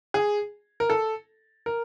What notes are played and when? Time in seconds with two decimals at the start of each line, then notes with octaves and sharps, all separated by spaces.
0.14 G#4
0.80 A#4
0.90 A4
1.66 A#4